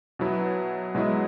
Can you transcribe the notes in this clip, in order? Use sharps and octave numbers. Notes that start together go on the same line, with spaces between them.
B2 F#3 B3 E4
B2 F#3 G#3 E4